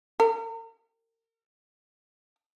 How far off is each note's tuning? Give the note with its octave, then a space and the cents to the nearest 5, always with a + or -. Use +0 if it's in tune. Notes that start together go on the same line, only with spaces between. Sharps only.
A#4 -35